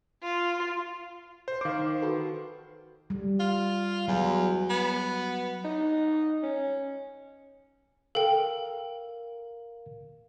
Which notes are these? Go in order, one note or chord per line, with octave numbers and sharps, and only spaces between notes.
F4
C5
D#3 C5 F5 C6 D6
F#4 A4 B4
G3
F4
E2 F#3
B3
D#4
C#4
A4 A#4 F5 G5